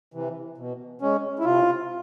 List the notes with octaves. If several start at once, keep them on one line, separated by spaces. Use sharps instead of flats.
C3 E3
B2
G#3 C#4
E4
C3 F4